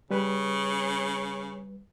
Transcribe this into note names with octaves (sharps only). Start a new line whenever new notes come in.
C#3 G3 B4